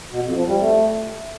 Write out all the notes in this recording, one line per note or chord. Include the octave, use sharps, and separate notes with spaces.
B2
F2
F3
G3
A3